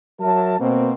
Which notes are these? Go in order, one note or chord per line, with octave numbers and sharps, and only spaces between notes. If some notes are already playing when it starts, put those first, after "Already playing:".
F#3 A#4 E5 A5
B2 A#3 C4